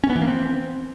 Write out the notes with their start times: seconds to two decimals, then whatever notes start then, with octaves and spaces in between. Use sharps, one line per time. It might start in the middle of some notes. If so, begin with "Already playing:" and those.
0.04 C#4
0.10 B3
0.16 E3
0.22 A#3
0.28 C4